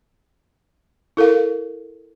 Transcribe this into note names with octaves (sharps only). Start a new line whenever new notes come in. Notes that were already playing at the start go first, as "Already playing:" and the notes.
E4 A4 A#4 F5